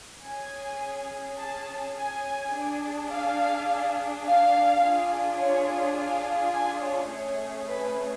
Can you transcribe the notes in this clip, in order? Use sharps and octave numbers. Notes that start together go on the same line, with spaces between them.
C#4 G#4 G#5
A5
G#5
D4 G#4
F5
F5
D4 F4 G#4
C#5
F5
G#5
C#5
A3 C#4 G#4 C#5
B4